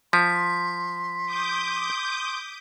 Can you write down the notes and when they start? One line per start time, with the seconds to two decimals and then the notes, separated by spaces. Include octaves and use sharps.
0.13 F3 C6 B6
1.25 D6 D#6 G6